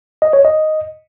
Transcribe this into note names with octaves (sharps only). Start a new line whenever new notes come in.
D#5
C#5
D#5